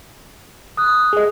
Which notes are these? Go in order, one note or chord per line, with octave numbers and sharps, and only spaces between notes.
D#6 F#6
G#4 D#5